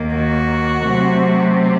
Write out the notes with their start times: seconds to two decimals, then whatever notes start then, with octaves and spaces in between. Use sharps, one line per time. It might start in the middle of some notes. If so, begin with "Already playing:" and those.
Already playing: D#2 D#3 A#3
0.16 F#4
0.85 C3 F#3 A3 C4